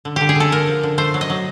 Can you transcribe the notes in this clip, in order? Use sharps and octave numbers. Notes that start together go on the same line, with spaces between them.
D3
D3 G4
G#4
D3 A4
D3 A#4
F3
D3
A3 C5
F#3
D#5
F#3